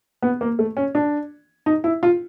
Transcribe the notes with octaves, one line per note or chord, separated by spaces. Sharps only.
B3
A#3
A3
C#4
D4
D#4
E4
F4